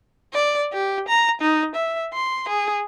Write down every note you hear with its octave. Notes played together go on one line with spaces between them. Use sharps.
D5
G4
A#5
D#4
E5
C6
G#4